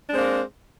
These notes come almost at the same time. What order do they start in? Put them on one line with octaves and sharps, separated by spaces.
D4 G#3 C4 A#3